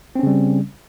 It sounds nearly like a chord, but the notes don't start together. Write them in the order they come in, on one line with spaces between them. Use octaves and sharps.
C4 C#4 C#3 G3